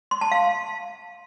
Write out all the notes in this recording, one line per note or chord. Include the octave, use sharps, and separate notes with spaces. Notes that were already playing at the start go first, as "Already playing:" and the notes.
C6
A5
F5